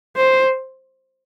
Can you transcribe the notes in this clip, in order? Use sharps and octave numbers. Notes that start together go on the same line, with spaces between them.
C5